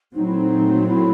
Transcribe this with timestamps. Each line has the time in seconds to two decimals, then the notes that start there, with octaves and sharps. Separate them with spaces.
0.14 A#2 F#3 A3 C4 D#4
0.26 E4
0.37 D#4
0.87 E4